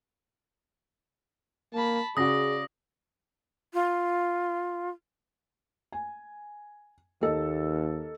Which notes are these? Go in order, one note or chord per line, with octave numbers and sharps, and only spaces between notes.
A#3 A5 B5
C#3 F#4 G#4 D5 D#6 A#6
F4
G#5
D#2 A#3 A4 D#5